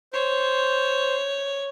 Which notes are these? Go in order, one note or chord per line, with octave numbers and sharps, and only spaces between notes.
C5 C#5